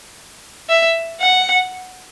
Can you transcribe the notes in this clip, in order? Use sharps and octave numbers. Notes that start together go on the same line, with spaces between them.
E5
F#5